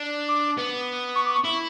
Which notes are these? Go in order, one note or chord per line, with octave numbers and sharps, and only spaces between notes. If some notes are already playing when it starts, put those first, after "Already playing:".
Already playing: D4
D6
B3
C#6
D6
C#6
E4